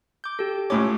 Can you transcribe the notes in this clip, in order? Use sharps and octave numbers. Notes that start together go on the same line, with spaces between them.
D6 G6
G4 A4
C#2 A2 C#4 D6